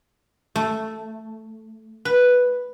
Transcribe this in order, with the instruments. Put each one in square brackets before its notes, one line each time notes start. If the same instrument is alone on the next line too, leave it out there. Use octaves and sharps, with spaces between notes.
[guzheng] A3
B4